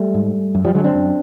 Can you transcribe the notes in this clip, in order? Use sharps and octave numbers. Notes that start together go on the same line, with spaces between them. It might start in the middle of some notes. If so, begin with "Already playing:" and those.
Already playing: G3 A3
G#2
F#2
F3 G3
D3 F#3 G#3
C4 D4
F#2